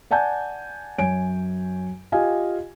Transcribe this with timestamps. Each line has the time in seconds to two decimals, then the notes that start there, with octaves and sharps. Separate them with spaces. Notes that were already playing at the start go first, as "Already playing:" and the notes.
0.11 D5 F#5 G#5 A5 G6
0.98 F#2 C#5 G#5 D7
2.12 F4 G4 D#5 F5 G#5